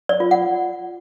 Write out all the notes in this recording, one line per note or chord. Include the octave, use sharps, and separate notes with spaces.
D5
F4
F#5